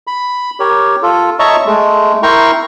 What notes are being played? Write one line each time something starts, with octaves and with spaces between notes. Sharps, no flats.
B5
G4 A#4 C#5
F4 A4
C#5 D#5 E5 A5 A#5 C#6
G#3 A3
E4 A#4 G5 A#5 C6 C#6